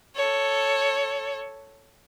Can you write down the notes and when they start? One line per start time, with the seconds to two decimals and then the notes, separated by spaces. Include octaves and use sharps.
0.15 A4 C#5